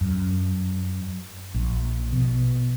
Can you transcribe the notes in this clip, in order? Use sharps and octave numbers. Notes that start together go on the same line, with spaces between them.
F#2
A#1
B2